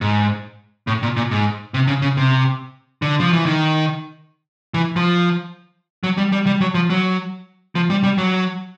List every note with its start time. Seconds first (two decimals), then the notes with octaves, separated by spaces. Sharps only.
0.01 G#2
0.87 A2
1.03 A#2
1.17 A#2
1.31 G#2
1.74 C3
1.88 C#3
2.02 C#3
2.17 C3
3.02 D3
3.20 F3
3.33 E3
3.46 D#3
4.74 E3
4.96 F3
6.03 F#3
6.18 G3
6.32 G3
6.46 G3
6.61 F#3
6.74 F3
6.90 F#3
7.75 F3
7.90 G3
8.04 G3
8.18 F#3